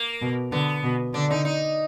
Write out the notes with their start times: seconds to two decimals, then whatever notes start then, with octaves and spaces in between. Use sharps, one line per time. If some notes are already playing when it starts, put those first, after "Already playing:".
Already playing: A#3
0.22 B2
0.52 D3 B3
0.84 B2
1.14 D3 D4
1.31 D#4
1.45 D#4